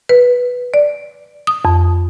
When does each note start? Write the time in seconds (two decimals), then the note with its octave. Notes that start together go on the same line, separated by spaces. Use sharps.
0.09 B4
0.74 D5
1.47 D#6
1.65 F2